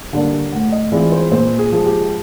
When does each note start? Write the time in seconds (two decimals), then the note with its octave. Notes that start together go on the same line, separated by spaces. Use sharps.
0.13 D3 G3 A#3 D4
0.52 A2 F#5
0.72 D#5
0.92 E3 G#3 C4 F4 D5
1.12 C5
1.31 A#2 C5
1.59 G#4
1.72 F3 G#3
1.85 G4